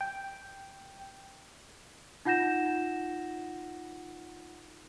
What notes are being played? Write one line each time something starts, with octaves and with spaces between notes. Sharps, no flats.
G5
D#4 F4 F#5 G6 A#6 E7